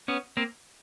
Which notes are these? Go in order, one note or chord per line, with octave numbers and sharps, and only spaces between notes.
B3 C#4
A#3 C4